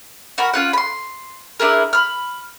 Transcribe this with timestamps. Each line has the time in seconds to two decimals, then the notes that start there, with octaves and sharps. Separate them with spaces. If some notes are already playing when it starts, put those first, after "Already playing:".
0.38 F#4 A#4 B5
0.54 C#4 F4 F#5
0.73 B5 C6
1.60 D4 E4 G#4 A#4
1.93 B5 F6